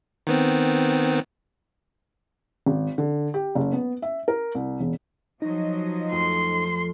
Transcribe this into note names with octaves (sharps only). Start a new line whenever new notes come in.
D#3 B3 C4
G#1
D3
G4
F#1
B3
E5
A#4
C2
E1
F3 F#3 D#4 D#5 A#6
F2 A3 C6